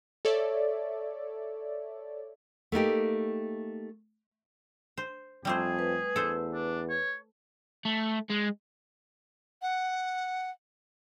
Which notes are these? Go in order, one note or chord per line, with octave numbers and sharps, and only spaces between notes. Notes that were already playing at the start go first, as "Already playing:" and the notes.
A4 C#5 D5 E5
A3 A#3 D#4 G4
C5
F2 G3 A3 G#4 C5
B4
E2 A4 C5
D4
C#5
A3
G#3
F#5